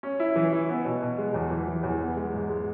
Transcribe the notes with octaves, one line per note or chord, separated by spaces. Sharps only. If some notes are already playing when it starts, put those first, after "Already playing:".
C#4
E4
E3
E4
B3
B2
B2
G#3
E2
E3
E3
E2
B3
G#3
G#2
G#3